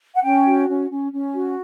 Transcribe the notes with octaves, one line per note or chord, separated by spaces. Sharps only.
F#5
C#4 G5
F#4
C#4
C#4
C#4
F#4